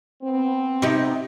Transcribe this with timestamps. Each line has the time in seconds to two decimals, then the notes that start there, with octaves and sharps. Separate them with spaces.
0.23 B3 C4
0.82 C3 D#4 G4